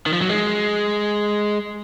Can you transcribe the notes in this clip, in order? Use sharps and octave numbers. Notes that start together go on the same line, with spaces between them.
D#3
F3
F#3
G#3